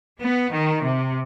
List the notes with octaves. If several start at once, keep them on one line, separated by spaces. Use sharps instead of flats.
B3
D#3
C3